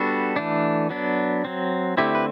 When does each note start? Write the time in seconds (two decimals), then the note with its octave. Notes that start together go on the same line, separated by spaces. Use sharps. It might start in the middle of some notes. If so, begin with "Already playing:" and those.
Already playing: G3 B3 D4 F#4 A4
0.36 E3 A3 D4
0.90 F#3 B3 D4
1.45 F#3 C4
1.97 D3 A3 C4 E4 G4
2.15 B4